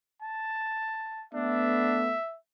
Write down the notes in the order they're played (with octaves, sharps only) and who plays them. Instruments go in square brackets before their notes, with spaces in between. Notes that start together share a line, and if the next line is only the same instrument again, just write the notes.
[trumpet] A5
[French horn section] A3 B3 [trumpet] D4 [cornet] E5